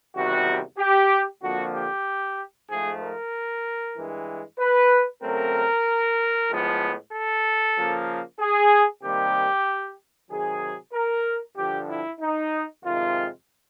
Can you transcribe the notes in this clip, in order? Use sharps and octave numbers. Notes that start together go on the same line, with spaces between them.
E2 C3 D#3 G3 F#4
G4
F2 D3 F3 A#3 F#4
G4
G#2 F3 A3 G#4
A#4
G2 E3 G#3
B4
C#3 F#3 A3 C4 A#4
A2 F3 G#3 B3
A4
C#3 F3 A#3
G#4
C3 D#3 G3 A#3 G4
C3 D#3 F#3 G#4
A#4
G2 D3 F3 G4
E4
D#4
F2 C3 D#3 G#3 F4